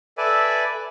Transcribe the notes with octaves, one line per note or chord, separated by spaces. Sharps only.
A4 B4 D5 E5 G#5